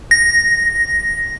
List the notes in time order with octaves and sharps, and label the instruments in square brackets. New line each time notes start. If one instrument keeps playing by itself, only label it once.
[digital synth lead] A#6